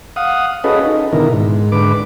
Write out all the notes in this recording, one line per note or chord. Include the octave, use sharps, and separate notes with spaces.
F5 F#5 D#6
C#4 F#4 G#4 A4 B4 D#5
D#4
B2 D3 D#3 E4 A#4
G#2
G#2 D3 B4 D6